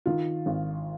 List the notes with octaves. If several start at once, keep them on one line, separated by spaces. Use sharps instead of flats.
D#3 F4
G#1